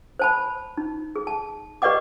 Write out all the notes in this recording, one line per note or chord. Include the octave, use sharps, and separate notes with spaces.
C5 A5 B5
D#4
G#4
A5
G4 B4 D5 D#5 F#5 D6